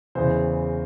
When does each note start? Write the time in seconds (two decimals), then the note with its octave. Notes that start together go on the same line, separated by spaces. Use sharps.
0.15 E2 C#3 E3 C5